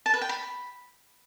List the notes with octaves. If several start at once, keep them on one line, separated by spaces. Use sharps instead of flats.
A5
B4
G5
B5